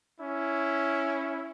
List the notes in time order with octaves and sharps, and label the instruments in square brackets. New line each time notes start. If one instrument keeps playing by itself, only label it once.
[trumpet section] C#4 E4